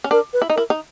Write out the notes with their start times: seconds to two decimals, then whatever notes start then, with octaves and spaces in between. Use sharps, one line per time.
0.04 C#4
0.11 D4 A#4
0.33 B4
0.42 E4
0.50 D#4
0.56 E4 A#4
0.70 D#4